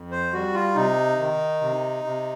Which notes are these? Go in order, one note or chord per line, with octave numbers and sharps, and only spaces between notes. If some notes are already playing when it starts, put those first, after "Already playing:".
Already playing: F2
C5
G3 F#4
F4
C3 D#4
D#3
C3
C3